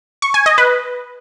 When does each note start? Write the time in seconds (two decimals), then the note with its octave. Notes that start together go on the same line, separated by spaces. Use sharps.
0.22 C#6
0.34 G#5
0.46 D#5
0.58 B4